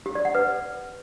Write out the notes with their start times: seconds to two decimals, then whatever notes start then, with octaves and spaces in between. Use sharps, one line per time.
0.06 G4
0.15 D5
0.25 F#5
0.35 B4